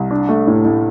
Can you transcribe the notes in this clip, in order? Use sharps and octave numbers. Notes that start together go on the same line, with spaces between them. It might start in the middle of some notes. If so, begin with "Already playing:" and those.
Already playing: C2
D4
A3
A2
A2